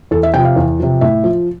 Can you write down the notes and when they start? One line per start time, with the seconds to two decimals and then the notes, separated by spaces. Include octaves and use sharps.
0.11 E2 A4
0.23 E5
0.34 C3 F3 G5
0.45 F5
0.56 E2
0.79 C3 F3
1.01 A2 E5
1.24 F3